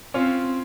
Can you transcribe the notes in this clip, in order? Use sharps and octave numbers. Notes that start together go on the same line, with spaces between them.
C4 C#4 F4